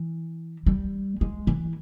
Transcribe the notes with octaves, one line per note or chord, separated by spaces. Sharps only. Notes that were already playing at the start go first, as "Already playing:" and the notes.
Already playing: E3
G3
G#3
E3